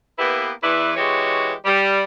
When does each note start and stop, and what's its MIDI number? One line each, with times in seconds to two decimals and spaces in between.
0.19 0.51 58
0.19 0.51 59
0.19 0.51 64
0.19 0.51 67
0.19 0.51 71
0.63 0.93 40
0.63 0.93 52
0.63 0.93 64
0.63 0.93 71
0.63 0.93 74
0.97 1.53 52
0.97 1.53 56
0.97 1.53 66
0.97 1.53 67
0.97 1.53 73
1.65 2.03 55